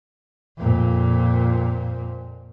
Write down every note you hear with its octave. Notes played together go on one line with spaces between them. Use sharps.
F2 A#2